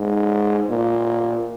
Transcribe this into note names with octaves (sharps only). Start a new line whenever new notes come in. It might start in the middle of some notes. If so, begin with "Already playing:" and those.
Already playing: G#2
A#2